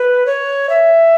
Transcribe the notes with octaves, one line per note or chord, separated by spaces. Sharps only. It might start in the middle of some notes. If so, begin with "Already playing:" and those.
Already playing: B4
C#5
E5